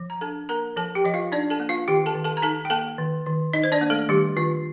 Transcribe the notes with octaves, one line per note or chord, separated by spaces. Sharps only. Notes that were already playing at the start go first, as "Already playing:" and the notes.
Already playing: F3
A#5
D4 A4 A5
A#3 A#4 A#5
F3 A4 A5
G4 G5
F3 D#5
F4 F5
D4 D#4 D5
A4 A5
A#3
F4 F5
D#3 G4 G5
A4 A5
D#3
A4 A5
A#5
D#4 A4 A5
G5
A#3 A4 A5
D#3
D#3
D#4 D#5
C5
D4 D5
A#3
A3 A4
D#3 G3 G4
D#3 F4